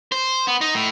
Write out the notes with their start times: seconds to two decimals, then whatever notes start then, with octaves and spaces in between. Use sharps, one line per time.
0.12 C5
0.47 B3
0.61 D#4
0.74 A2